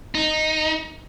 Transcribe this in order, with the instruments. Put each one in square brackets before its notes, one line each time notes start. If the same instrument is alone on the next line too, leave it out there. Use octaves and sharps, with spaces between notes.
[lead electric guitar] D#4